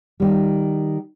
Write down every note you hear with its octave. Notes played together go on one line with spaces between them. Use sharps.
D#3 G3